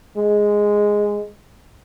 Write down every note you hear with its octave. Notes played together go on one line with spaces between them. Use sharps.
G#3